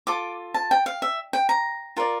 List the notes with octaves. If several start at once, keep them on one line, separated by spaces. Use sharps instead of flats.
F4 A4 D6
A5
G5
F5
E5
G5
A#5
F4 A#4 D5